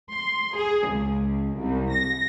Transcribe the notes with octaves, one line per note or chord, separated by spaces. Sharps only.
C6
G#4
C#2
C2
A#6